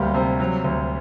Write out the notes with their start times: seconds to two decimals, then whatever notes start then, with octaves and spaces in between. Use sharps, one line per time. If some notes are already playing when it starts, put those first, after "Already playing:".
Already playing: D2 F#3 G3 A#3
0.14 C3
0.40 F#3
0.64 D2